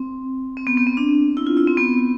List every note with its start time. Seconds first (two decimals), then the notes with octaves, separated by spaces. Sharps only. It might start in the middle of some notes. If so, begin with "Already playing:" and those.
Already playing: C4
0.57 C4
0.67 B3
0.77 B3
0.87 C4
0.97 D4
1.37 E4
1.47 F4
1.57 E4
1.67 C4
1.77 B3